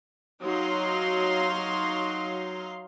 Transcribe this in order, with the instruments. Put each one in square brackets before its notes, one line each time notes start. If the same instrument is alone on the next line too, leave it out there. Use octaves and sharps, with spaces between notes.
[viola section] F#3 D#4 F5 C6